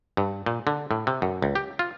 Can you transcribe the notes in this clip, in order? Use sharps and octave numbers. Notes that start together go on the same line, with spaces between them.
G2
A#2
D3
A2
C3
F#2
C#2
G4
F4